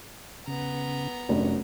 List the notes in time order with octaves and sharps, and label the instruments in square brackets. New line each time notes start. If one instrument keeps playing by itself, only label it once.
[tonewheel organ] C#3 [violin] B3 A#5
[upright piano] F1 [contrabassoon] F#2 [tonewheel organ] D4